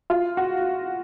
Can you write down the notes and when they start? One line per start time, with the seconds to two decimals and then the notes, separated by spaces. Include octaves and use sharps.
0.10 F4
0.37 F#4